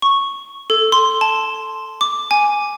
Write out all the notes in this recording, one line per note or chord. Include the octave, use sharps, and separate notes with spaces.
C#6
A4
C6
A5
D6
G#5